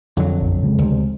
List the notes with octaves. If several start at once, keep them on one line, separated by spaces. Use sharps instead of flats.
F2 D3 F#3
A#1 F#2
C#3 G#3
D2 C3